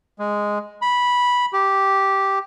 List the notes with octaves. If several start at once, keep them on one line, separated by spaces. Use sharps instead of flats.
G#3
B5
G4